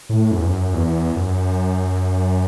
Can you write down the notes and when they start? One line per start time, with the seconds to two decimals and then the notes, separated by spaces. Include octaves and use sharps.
0.09 A2
0.31 F#2
0.38 E2
0.46 F#2
0.73 E2
1.16 F#2